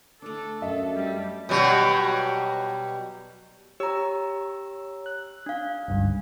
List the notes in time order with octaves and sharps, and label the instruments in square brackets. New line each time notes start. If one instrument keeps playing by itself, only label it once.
[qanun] A3 D4 [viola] A4
[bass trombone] F#2 [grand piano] D#5 E5
[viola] G3
[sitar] B2 F#3 G3
[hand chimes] G4 A#5 [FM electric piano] C#5 E6
[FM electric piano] F#6
[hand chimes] D4 F5
[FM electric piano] G1 C#2 G2